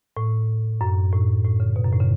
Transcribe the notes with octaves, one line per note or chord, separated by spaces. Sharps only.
A2
F#2
A2
A2
C#3
B2
F#2
A2
C#3